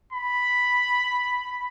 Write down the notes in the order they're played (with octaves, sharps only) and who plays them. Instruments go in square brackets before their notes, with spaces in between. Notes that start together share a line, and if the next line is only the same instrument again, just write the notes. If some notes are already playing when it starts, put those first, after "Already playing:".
[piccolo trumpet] B5